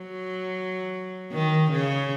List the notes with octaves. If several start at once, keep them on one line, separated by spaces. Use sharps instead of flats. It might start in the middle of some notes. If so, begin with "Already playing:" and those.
Already playing: F#3
D#3
C#3